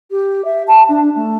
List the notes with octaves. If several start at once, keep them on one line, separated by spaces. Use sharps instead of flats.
G4
E5
A5
D4
A3